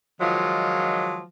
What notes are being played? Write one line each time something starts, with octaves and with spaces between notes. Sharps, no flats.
D#3 F3 F#3 G#3 F4